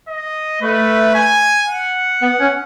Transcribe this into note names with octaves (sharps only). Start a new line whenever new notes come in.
D#5
A3 B4
G#5
F#5
B3
C#4